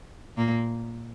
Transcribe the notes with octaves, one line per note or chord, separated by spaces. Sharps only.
A#2 A#3